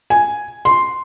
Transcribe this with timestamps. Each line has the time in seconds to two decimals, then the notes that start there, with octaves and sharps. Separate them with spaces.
0.10 G#5
0.65 C6